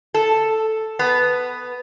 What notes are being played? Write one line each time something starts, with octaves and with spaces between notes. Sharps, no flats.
A4
B3